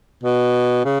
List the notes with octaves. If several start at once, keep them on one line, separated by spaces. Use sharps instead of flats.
B2
C#3